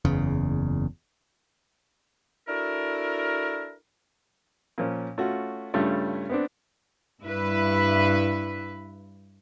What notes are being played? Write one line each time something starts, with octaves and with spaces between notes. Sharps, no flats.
F#1 E2 C#3
D4 E4 F#4 A4 A#4
A#2 F3 C#4
A3 C#4 F4 F#4
G2 C#3 G3 A3 C#4 F4
B3 C4 D4
G2 E4 B4